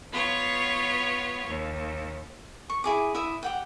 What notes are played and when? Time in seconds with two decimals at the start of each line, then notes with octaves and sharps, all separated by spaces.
0.12 B3 F4 C#5
1.46 D#2
2.70 C#6
2.84 E4 G#4 D6
3.15 E4 E5 D#6
3.43 G4 F#5 G5